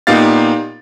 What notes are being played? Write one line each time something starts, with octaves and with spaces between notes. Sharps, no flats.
A#2 B3 D#4 G4 F5 A6